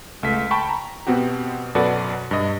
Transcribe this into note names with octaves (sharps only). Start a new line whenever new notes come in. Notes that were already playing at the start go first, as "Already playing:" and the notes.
C#2 A3 B6
G5 A5 B5 C#6
A#5
B2 B3 C4 F#4 G4
F#2 B2 F#4 A4 B4 D5
G2 D#5